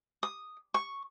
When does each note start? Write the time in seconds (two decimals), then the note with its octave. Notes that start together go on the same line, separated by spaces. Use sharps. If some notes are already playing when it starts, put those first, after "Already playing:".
0.23 D#6
0.74 C#6